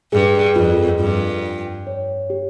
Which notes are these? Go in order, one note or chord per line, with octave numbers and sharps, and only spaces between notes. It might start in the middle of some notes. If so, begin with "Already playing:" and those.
G2 G#4
F2 F4
G2 F4
G5
C#5
G4